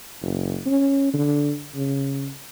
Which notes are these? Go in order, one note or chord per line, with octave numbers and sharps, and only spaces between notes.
F#1
C#4
D3
C#3